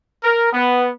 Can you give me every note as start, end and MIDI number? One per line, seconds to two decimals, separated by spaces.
0.24 0.51 70
0.53 0.89 59